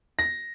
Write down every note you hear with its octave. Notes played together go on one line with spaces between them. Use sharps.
A#6